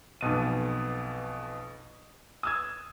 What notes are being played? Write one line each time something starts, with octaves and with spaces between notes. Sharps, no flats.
B1 F2 B2 D#7
D#6 E6 G#6